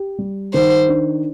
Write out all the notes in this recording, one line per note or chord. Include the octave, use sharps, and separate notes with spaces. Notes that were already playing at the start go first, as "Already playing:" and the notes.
Already playing: G4
G3
D#3 C5
D4